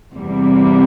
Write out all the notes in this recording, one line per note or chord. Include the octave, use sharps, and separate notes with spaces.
E2 C3 G3 A#3